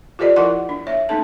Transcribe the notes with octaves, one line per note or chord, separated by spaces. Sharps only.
F4 G4 A4 C5 D5 D#5
F3 E4 A#4 F#5 C6
D4
C#5 E5
A3 C#4 D#4 A4 A5